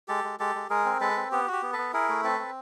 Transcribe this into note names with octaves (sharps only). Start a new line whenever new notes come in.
G#3 G4 A4
G#3
G#3 G4 A4
G#3
G#3 G#4 A#4
C4
G#3 A4 B4
C4
B3 G4
F#4 G4
B3
A4 B4
B3
E4 G#4 A#4
A3
C4 A4 B4
C4